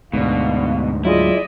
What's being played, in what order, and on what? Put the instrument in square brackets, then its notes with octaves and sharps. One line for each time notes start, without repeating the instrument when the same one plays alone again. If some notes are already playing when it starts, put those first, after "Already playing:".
[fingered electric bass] D2 G#2 [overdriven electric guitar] B2 [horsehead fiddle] D4 F5
[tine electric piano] F#3 F4 G#4 [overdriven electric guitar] E4 [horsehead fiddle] D5 D#5